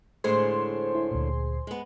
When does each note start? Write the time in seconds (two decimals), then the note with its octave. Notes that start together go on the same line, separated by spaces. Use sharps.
0.24 A2 D3 G#3 G#4 C5 C6
0.95 E4
1.11 D2 A#2
1.67 G#3 B3